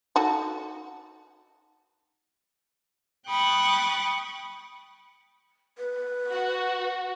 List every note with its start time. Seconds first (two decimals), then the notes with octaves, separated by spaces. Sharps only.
0.16 D#4 F#4 A4
3.28 G5 B5 C#6 D#6 F#6 A6
5.78 B4
6.31 F#4